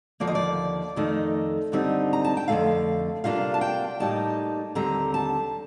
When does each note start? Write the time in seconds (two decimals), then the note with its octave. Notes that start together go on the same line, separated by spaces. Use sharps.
0.20 D#2 D3 F3 A#3 D5
0.27 D#5
0.35 D5
0.96 F2 D#3 A3 D#4
1.72 G2 D3 G3 C4 D#4
2.13 A#5
2.25 A5
2.37 G5
2.48 F2 D3 A3 F5
3.24 C3 G3 A#3 D4 F4 F5
3.54 A5
3.61 G5
4.00 A2 G3 A#3 D#4 A5
4.75 D#2 D3 G3 C4 A#5
5.14 A5